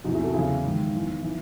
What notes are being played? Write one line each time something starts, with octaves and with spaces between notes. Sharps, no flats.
E2 C3 E3 D#4 F#4
E4 G#4
F#4 A4
E2 C#3 E3 E4 G#4
G#2 D#3
E2 D#3
E3